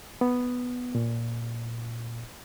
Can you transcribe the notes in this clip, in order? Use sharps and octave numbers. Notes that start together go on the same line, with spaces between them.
B3
A#2